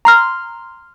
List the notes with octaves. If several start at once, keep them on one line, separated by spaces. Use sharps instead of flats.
A#5 C6 F6